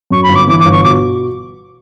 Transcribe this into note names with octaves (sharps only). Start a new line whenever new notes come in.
F#2 C#6
B5
G1
D6
E3 D6
D6
G1
C#6
B2 D6